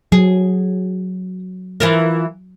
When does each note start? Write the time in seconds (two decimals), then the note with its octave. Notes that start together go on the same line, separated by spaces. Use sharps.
0.12 F#3 G#4
1.80 E3 F4 A#4